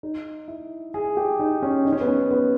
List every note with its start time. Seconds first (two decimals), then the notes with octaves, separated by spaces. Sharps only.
0.03 D#4
0.48 E4
0.94 G#4
1.17 G4
1.40 D#4
1.63 C#4
1.85 D#4
1.92 C#4
2.01 B3
2.08 C#4
2.31 B3